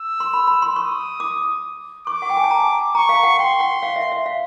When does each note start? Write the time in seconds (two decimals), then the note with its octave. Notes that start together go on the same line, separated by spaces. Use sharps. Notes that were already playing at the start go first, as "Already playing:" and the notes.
Already playing: E6
0.20 C6
0.33 B5
0.47 B5
0.62 C6
0.76 C#6 D#6
1.20 D6
2.07 C#6 D6
2.22 F#5
2.30 G5
2.37 G#5
2.44 A5
2.51 A#5
2.95 A#5 C#6
3.09 F5
3.23 F#5
3.39 G5 C6
3.60 F#5
3.83 F5
3.96 E5
4.12 E5
4.26 F5